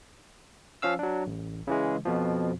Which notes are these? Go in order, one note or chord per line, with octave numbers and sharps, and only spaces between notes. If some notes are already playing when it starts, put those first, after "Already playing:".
F3 C#4 F5 E6
F#3 D4
A1
C#3 E3 G#3
F2 B2 F3